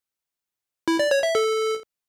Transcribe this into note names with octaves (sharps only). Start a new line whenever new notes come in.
E4
D5
C#5
E5
A4